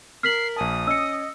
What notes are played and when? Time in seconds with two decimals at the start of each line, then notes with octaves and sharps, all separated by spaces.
0.23 A#4 F6 B6 C7 F#7
0.56 A#1 G#5 A5 D#6
0.87 C#4 D#5 E6 C#7